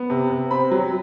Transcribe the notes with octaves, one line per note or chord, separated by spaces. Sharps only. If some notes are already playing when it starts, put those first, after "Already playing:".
Already playing: B3
C3
C3
C4 B5
F#3